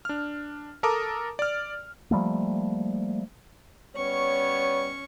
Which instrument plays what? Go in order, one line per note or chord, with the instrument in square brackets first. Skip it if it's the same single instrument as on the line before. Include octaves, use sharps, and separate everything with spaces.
[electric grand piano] D4 F6
A4 A#4 A5 A#5 D6 D#6
D5 F6
[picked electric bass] F3 G3 A3 A#3
[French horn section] G3 B3 C#5 [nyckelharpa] C#4 C#6